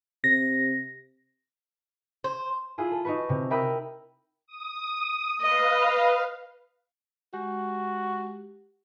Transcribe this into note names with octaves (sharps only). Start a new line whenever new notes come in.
C3 A#6
C5
E4 F4 G#4
A4
D#4 F#4 B4
C3
A#4 E5 G5 B5 D#6 F#6
D#6
B4 D#5 F5
G#3 F#4 G4